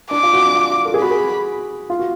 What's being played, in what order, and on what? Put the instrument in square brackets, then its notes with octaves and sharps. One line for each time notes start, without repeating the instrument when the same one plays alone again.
[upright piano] D4 [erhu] D6
[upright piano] F4
F#4
D4
F4
F4
A4
G#4
[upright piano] F#4 [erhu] B5
[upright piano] G#4
F4
F#4